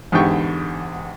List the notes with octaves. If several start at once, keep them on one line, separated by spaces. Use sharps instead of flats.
E2 G#2 D3 G4 G5 C#6